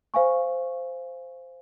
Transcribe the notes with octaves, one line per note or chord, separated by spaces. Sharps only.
C5 F5 G#5 C#6